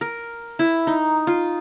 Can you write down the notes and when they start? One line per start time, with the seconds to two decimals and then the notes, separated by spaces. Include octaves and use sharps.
0.01 A#4
0.59 E4
0.87 D#4
1.27 F4